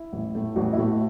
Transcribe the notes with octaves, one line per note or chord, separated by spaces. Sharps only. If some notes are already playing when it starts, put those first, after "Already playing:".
Already playing: E4
A1
A2 A3
A1 F#4
E4
A2 A3 F#4